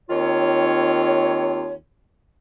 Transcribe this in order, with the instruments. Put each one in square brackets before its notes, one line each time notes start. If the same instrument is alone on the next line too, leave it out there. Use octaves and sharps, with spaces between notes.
[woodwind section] D#2 D#3 C4 F4 C#5